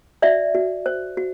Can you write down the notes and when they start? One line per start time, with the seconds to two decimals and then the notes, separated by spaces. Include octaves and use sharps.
0.22 F#4 D5 E5
0.55 F#4
0.86 C5
1.17 F#4